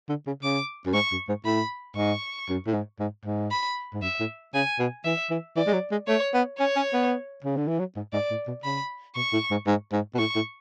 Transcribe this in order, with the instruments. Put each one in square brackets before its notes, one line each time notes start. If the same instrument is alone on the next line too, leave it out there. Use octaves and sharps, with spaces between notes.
[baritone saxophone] D3
C#3
[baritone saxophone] C#3 [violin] D6
[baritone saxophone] F#2
[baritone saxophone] G#2 [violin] C#6
[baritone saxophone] F#2
G#2
[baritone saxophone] A2 [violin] B5
[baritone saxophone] G#2 [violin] C#6
[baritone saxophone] F#2
A2
G#2
G#2
G#2
[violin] B5
[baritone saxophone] G#2
[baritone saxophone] F#2 [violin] E5
[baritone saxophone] A2
[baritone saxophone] C#3 [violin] G#5
[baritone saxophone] B2
[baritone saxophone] E3 [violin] E5
[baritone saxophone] E3
[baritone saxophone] E3 [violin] D5
[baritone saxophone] G#3
F#3
G#3
[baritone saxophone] A3 [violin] C#5
[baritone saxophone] B3
[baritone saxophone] C#4 [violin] C#5
[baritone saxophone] C#4
B3
C#3
D3
E3
F#3
G#2
[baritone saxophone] G#2 [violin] D5
[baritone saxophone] A2
B2
[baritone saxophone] C#3 [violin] B5
[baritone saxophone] B2 [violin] C#6
[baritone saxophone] A2
G#2
G#2
G#2
B2
[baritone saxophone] A2 [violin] C#6
[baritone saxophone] A2